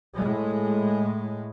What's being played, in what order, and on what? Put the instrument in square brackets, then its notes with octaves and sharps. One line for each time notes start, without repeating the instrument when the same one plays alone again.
[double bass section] A2 G#3